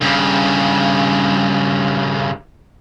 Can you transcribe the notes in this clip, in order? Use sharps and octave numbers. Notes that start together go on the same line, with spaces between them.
G2 C#3